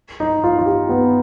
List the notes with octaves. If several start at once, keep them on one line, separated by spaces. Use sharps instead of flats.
D#4
F4
F4
G4
B3